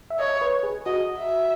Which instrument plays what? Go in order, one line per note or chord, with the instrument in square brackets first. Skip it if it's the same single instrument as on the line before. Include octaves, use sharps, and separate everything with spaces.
[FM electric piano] E5
[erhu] C#5 [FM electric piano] D#5
[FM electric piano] B4
G#4
[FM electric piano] F#4 [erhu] D#5
[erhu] E5